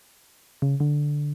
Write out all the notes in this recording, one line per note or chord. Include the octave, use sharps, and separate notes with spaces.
C#3
D3